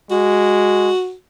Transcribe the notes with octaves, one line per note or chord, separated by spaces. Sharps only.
G#3 F#4